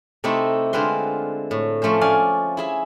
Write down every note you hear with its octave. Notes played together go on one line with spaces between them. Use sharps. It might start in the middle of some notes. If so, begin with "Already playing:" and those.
C3 A3 C4 D#4 E4 A4
D3 G#3 C4 F4 B4 C6
A2
F3 A3 C#4 C5
C#4 D5 F5 G#5
E4 G#4 E5